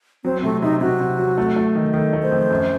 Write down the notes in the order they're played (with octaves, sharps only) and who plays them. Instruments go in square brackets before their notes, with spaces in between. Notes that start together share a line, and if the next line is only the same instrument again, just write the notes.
[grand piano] F#3 [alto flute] C4
[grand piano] C3 [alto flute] A3
[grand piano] C3 [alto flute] D#4
[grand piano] C3 [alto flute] F#4
[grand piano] C3
F#3
A3
A3
D#3
[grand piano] D#3 [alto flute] A4
[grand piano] A3
[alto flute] C5
[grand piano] F2
F#2